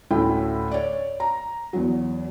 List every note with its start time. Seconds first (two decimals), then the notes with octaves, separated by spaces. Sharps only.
0.11 D2 A2 C#4 E4 A4 G5
0.71 C#5 D5
1.20 A#5
1.73 E2 F#3